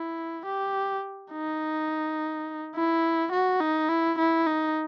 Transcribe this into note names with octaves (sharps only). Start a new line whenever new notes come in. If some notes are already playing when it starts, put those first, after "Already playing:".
Already playing: E4
G4
D#4
E4
F#4
D#4
E4
E4
D#4